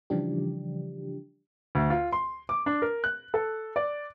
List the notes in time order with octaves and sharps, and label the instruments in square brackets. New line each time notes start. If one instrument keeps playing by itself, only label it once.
[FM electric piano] C#3 E3 F3 G3 D4 G4
[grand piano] D2
F4
C6
D6
D4
A#4
F#6
A4
D5